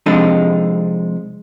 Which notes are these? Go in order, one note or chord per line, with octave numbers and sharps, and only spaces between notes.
C3 F3 G#3 D4 D#4 A4